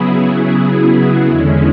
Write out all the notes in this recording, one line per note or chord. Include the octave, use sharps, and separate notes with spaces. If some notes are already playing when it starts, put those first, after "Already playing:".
Already playing: C#3 F#3 B3 E4 G#4
E2 D3 G#3 C#4 E4